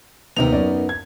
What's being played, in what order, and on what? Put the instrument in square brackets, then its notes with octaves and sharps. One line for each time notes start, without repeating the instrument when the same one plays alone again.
[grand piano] D#2 C3 F7 [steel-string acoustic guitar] B3 D#4 A#4
[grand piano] F#2 C#4 D5
G#6